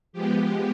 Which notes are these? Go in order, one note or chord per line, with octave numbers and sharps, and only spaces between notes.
F3 G#3 B3 G4